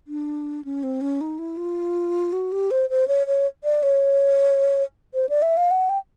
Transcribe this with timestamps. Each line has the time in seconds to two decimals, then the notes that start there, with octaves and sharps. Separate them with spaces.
0.07 D4
0.64 C#4
0.83 C4
1.01 C#4
1.21 D#4
1.39 E4
1.57 F4
2.32 F#4
2.52 G4
2.71 C5
2.90 C5
3.08 C#5
3.27 C#5
3.64 D5
3.83 C#5
5.14 C5
5.29 D5
5.42 E5
5.57 F5
5.71 F#5
5.89 G5